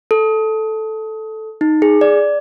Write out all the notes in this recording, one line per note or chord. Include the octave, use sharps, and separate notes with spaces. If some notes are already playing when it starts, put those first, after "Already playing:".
A4
D#4
G#4
D5